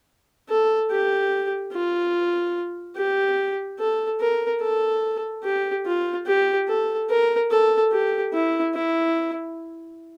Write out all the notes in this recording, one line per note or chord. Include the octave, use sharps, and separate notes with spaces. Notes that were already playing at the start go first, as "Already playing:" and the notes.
A4
G4
F4
G4
A4
A#4
A4
G4
F4
G4
A4
A#4
A4
G4
E4
E4